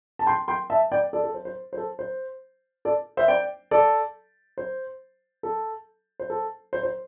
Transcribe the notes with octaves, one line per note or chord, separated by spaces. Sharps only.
A5
G5 C6
G5 C6
E5 A5
D5 G5
A4 D5
A4
C5
C5
C5
A4
C5
A4 D5
C5 E5
D5 G5
A4 D5
C5
A4
C5
A4
C5
C5